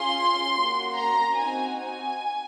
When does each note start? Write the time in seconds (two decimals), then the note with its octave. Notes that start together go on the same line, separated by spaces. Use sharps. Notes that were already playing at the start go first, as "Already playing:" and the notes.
Already playing: C#4 F4 G#4 C6
0.55 A#3 C#4 F#4
0.96 A#5
1.36 C4 D#4 F#4 G#5
1.78 G#5